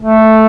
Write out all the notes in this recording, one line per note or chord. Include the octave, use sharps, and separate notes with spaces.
A3